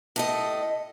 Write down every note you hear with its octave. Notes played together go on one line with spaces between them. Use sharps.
A2 A4 D#5